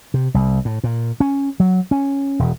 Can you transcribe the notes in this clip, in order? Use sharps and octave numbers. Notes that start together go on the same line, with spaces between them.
C3
C2
A2
A#2
C#4
F#3
C#4
E1